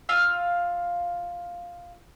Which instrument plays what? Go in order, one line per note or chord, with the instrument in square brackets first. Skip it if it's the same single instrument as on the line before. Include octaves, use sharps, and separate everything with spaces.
[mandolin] F4 F5 E6